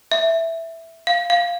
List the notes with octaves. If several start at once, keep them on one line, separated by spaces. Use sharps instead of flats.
E5
F5
F5